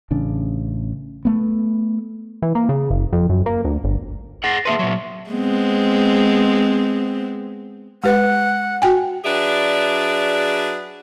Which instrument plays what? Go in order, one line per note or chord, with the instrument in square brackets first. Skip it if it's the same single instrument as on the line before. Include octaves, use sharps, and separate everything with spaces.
[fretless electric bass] A1 C#3 D4
A3 B3
[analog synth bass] E3
A#3
C#3
F#1
F2
F#2
A#3
D2
G1
[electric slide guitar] G#4 F#5 [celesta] A6 A#6 C7
[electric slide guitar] A#3 G#4 B4 [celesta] E5 A5 C6
[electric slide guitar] A#2 F#3
[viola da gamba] G#3 B3 C4
[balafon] G#3 G4 B4 [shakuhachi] F#5
[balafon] F#4 G5 G#5
[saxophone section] F#3 D4 G#4 B4 D5 E5